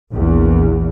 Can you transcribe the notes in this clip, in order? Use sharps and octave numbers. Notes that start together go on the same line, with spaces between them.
A#1 E2